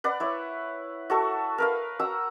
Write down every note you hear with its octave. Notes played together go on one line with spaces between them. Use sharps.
B4 D5 F#5
E4 C#5
F#4 A4 C#6
A#4 B4 F5
F#4 A#5 E6